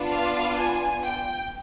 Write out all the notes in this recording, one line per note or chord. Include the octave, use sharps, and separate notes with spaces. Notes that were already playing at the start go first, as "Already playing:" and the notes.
Already playing: B3 D4 F4
F5
G#5
G5